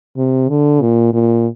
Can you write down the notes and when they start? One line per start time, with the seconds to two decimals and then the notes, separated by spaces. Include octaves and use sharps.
0.17 C3
0.49 D3
0.82 A#2
1.14 A#2